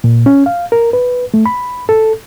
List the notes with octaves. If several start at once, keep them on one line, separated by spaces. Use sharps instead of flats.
A#2
C#4
F5
A#4
B4
A3
B5
A4